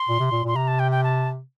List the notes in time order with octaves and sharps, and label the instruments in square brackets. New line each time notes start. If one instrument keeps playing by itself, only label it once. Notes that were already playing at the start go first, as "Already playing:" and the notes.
Already playing: [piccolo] C6
[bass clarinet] A#2
C3
A#2
[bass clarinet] A#2 [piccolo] C6
[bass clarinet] C3 [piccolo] A#5
[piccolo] A5
G5
G5
A5